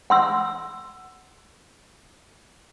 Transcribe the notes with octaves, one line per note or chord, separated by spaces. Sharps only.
F#5 C6 E6